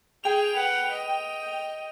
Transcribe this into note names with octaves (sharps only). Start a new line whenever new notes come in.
G#4 G5 F7
B4 F#5
D#5